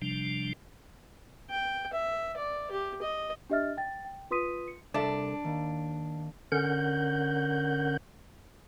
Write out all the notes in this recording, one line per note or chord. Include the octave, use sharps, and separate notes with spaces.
C3 F3 G3 D4
G5
E5
D5
G4
D#5
D4 G4 D#5 E5 F6 A6
G5 A6
G5
F4 B4 C6 D#6 B6 D#7
C#7
C2 D4 A4 E5
D#2
D3 C#4 A#4 F#5 G6